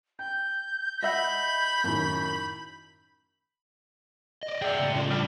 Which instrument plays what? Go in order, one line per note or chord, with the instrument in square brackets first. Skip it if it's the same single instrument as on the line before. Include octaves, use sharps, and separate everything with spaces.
[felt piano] G5 [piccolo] G6
[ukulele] D#5 E5 F#5 [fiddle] B5
[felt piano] F#2 A2 D#3
[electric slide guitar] D5 D#5
[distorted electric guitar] G#4 F#5 [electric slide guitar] D5 [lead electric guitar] E5 G5
[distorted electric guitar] C#2 A2
[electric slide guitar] A3 C#4 F4
[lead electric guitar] G3 [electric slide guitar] C#4 D4 D5